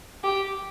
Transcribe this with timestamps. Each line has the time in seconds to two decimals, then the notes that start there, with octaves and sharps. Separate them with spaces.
0.24 G4